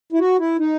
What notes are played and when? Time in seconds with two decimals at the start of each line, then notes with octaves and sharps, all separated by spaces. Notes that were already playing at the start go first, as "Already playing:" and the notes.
0.12 E4
0.19 F#4
0.39 E4
0.58 D#4